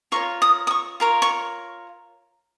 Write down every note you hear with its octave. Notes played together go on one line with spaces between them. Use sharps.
F4 A#4 C#5 C#6
D#6
D#6
C#6
F4 A#4 C#5
C#6